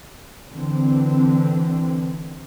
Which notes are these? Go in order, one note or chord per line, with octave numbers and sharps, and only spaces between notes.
D3 E3 C4